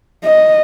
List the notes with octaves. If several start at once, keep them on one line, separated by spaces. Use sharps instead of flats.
D#5